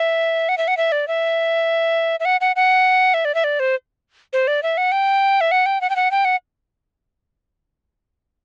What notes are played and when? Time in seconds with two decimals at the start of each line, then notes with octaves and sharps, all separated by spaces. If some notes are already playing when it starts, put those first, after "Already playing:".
Already playing: E5
0.49 F#5
0.57 E5
0.68 F#5
0.77 E5
0.92 D5
1.08 E5
2.20 E5
2.25 F#5
2.41 F#5
2.56 F#5
3.14 E5
3.25 D5
3.34 E5
3.44 D5
3.59 C5
4.33 C5
4.47 D5
4.63 E5
4.77 F#5
4.92 G5
5.41 E5
5.51 F#5
5.66 G5
5.81 F#5
5.90 G5
5.96 F#5
6.11 G5
6.25 F#5